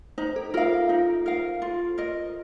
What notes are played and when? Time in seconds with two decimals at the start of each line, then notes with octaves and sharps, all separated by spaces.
0.18 D#4 C5
0.36 A4
0.54 F4 A#4 F5
0.89 D#4
1.26 A#4 F5
1.62 F4
1.98 A#4 D#5